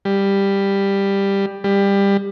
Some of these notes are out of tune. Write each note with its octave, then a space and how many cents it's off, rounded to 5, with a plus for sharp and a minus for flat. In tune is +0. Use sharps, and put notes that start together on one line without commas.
G3 +10
G3 +20